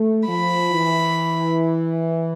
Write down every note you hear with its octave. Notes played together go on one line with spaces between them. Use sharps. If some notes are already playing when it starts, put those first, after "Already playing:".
Already playing: A3
F3 B5
E3